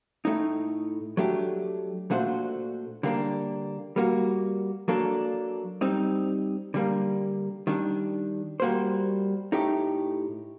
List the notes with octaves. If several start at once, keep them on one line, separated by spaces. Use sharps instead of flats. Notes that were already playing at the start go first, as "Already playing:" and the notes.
A2 A3 D#4
F#3 A3 D4 G4
A#2 A3 D4 F#4 C5
D3 G3 A#3 D4
G3 A#3 F#4
F#3 A#3 D4 A4
G3 C4 D#4
D3 G3 A#3
D#3 G3 D4
G3 A#3 F#4 C5
A2 A3 D#4 G4